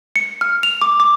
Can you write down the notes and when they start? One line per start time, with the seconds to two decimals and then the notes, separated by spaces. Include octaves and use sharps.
0.16 C#7
0.41 F6
0.63 F7
0.81 D6
1.00 D6